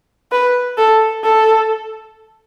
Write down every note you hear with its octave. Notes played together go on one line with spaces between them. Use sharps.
B4
A4
A4